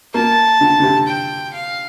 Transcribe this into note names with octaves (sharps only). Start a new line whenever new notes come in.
A#3 A5
D3
D3
C3
G5
F5